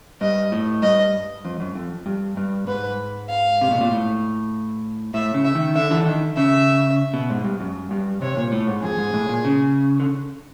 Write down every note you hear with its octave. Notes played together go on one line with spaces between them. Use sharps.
G2 D#5
A2
G2 D#5
F2
F#2
F2
G2
G2
G#2 B4
F5
C3
B2
A#2
A2
A2 E5
C#3
E5
D#3
D3 E5
D3 E3
D#3
C#3 E5
B2
G#2
G2
F#2
G2
C3 C#5
A#2
A2
G#2
F2 G#4
G#2
A2
A#2
C#3
D3